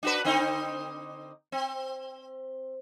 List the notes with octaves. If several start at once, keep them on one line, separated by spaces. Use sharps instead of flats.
D4 F#4 B4
D3 C4 D#4
C4